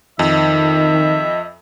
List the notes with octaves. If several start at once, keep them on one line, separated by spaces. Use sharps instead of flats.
F2 D#3 D#5 E5